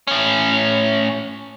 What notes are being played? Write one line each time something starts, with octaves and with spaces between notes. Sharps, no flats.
A2 C#4